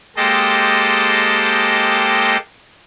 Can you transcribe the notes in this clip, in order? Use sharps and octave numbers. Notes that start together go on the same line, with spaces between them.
G#3 A#3 G4 A4 C5 D#5